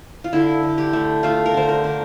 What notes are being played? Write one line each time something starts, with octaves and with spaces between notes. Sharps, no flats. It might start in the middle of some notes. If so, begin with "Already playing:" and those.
F4
D3 E4
D3
G4
A3
A3 F4
A#4
D3 C5
A#4
D3